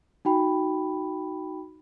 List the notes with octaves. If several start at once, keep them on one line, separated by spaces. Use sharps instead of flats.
D#4 F#4 G5 B5